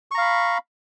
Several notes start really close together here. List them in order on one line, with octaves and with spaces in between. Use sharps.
C#6 A#5 F5 B5